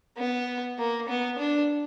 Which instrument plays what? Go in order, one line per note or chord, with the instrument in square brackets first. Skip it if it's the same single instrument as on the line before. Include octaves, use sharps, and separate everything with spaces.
[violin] B3
A#3
B3
D4